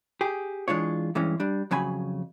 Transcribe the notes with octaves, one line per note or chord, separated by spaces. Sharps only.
G4 G#4
E3 G#3 D4 F4 C#5
G2 E3 G#3 C#4
G3 D4
F2 C#3 F#3 G#5 B5